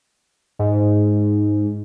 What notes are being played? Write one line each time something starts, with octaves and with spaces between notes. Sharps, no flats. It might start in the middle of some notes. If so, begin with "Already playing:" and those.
G#2